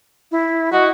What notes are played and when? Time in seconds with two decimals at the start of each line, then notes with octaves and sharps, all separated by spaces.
0.31 E4
0.72 F#4 D#5